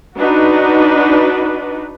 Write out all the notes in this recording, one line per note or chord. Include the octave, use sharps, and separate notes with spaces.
D4 D#4 F#4 B4